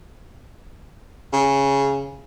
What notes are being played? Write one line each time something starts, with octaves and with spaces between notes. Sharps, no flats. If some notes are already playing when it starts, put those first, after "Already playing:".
C#3